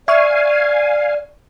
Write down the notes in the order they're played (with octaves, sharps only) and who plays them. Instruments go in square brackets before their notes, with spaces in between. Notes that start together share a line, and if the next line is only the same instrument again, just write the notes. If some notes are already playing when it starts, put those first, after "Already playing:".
[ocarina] D5 [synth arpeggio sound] E5 C#6 F6 [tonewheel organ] F5 G#5